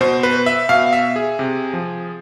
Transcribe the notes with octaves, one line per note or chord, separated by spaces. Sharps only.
B2 C5
B4
E5
B2 F5
E5
G#4
C3
F3